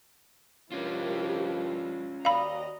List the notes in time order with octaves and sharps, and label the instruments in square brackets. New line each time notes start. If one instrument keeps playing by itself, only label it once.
[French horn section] G2 F3 [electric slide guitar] C#4 F4 [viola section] E4 G4 A#4
[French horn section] D#2 D5 [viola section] F#4 D#5 A#5 [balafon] F5 B5